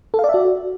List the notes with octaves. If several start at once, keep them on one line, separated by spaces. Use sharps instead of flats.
A4
F5
D5
E5
F#4